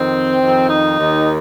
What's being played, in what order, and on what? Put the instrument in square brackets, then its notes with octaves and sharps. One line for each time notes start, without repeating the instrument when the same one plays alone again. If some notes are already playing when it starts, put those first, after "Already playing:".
Already playing: [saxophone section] F2 D#3 C4
F2 D#3
D#4
D#2 D#3